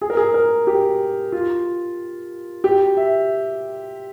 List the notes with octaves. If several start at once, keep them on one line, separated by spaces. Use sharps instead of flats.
G#4
A#4
G#4
A#4
G4
F4
G4
E5